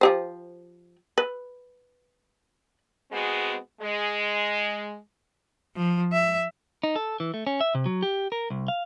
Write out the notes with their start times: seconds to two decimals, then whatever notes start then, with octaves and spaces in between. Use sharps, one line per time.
0.01 F3 G4 C5
1.18 B4
3.12 G#3 B3 C4 F#4 G#4
3.82 G#3
5.76 F3
6.12 E5
6.83 D#4
6.96 A4
7.20 E3
7.34 A3
7.47 C#4
7.61 E5
7.75 C3
7.86 F#3
8.03 G4
8.32 A#4
8.50 C2
8.68 F5